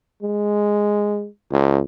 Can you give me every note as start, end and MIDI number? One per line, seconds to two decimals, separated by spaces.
0.23 1.27 56
1.51 1.81 37